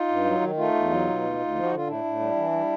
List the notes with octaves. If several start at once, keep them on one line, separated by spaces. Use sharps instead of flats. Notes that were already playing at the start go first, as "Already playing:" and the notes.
Already playing: D#4 F4
G2
F#3
D#3
A3 D#4 F4
E2
F#3
B2
D2
D2
F3
F#4
D3 F4
A2 D4 E4
A2
G3
E3
G3